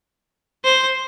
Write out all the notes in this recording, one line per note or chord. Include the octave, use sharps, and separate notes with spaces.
C5